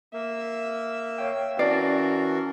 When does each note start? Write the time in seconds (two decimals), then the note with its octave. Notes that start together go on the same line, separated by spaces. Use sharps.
0.14 A#3 E5
1.18 C#5 F5 G5
1.59 E3 C#4 F#4 A#4 D5 A5 A6 C7